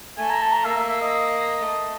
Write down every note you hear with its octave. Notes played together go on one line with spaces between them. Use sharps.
A3 G#5
A#5
A5
A#5
A#3 E5
E5
E5
D#5
A3